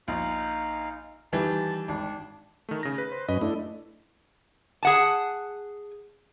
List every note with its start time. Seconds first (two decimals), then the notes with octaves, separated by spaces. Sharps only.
0.08 A#1 D#4 F5
1.33 D#3 E3 G3 A5
1.88 G#1 D4
2.69 D#3 A3
2.83 C#3 A#6
2.98 B4
3.12 C5
3.29 F#2 C#4 B4 D#5
3.41 A3 D4 E4
4.83 G#4 F#5 A5